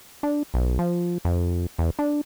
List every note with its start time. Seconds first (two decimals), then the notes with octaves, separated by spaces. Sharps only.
0.23 D4
0.54 B1
0.79 F3
1.25 F2
1.78 E2
1.99 D4